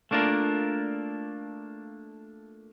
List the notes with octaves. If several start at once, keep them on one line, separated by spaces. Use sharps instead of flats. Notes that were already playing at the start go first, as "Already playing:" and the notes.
A3 A#3 D4 F4 A#4